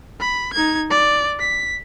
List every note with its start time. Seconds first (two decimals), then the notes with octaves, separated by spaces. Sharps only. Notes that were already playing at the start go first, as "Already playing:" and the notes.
0.20 B5
0.53 D#4 G#6
0.90 D5
1.39 B6